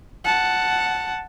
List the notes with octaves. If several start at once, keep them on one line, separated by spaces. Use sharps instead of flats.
F#5 A5